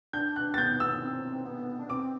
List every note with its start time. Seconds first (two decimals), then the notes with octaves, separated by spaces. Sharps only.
0.13 D4 G6
0.36 F#6
0.54 A6
0.58 B3 G6
0.80 E6
1.02 C4
1.45 B3
1.79 D4
1.89 C4 D6